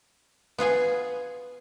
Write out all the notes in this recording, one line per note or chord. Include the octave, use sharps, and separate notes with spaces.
B3 F4 G#4 G#5